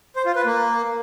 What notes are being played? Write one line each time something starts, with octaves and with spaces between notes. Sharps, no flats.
C5
F4
B4
A#3